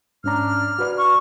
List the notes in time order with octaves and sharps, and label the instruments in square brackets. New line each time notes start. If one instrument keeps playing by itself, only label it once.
[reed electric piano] G#2 C#4 A#5 [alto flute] D4 [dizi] F6
[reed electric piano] F#4 B4 D5
[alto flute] C#6